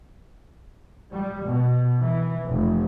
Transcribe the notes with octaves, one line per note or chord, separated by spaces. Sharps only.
G3
B2
E3
F1